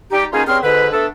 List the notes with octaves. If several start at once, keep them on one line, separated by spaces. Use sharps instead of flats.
G3 D#4 G4
B2 A#3 C#4 D#4 F4 G#4
G2 C#3 C4 G#4 C6 F6
G#2 B2 D3 B4
A3 B3 D4 A4